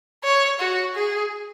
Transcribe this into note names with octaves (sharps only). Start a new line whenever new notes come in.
C#5
F#4
G#4